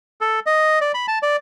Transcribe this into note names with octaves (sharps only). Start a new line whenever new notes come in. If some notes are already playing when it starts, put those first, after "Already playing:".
A4
D#5
D5
B5
A5
D5